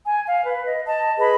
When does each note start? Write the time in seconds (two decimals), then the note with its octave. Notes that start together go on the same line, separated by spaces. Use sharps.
0.06 G#5
0.26 F5
0.45 B4
0.66 D#5
0.85 D#5 A5
1.18 G#4 B4 D#5 B5